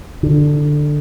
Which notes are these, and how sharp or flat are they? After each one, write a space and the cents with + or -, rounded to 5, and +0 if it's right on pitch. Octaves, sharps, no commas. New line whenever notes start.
D3 +10